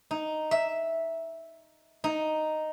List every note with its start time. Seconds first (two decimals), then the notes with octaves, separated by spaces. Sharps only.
0.11 D#4
0.51 E5
2.04 D#4